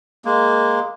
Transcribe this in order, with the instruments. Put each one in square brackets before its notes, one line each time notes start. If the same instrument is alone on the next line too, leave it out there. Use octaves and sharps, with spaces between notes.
[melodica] G#3 A#3